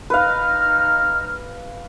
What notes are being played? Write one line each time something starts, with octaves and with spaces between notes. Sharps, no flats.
D#4 B4 F5 F6